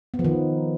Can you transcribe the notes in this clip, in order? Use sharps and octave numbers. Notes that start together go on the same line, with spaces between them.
B3
F3
D#3